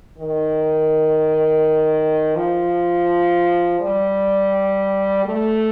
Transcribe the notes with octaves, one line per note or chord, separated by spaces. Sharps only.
D#3
F3
G3
A3